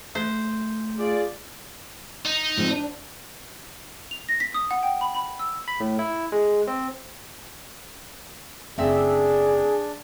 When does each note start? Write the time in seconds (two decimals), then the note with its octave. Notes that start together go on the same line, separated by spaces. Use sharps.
0.15 A3 C5
0.98 F4 G#4 D5
2.25 D#4
2.57 G#2 F3 C4
2.71 D4
4.11 F7
4.29 A#6
4.40 B6
4.54 D#6
4.71 F#5
4.83 G5
5.01 B5
5.15 B5
5.39 E6
5.68 B5
5.80 A2
5.99 E4
6.32 G#3
6.67 C4
8.78 F#1 A3 C4 D4 G#4 E5